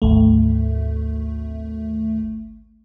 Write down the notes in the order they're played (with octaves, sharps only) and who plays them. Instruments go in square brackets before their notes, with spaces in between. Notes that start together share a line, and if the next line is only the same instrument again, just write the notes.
[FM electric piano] G#1 D2 A3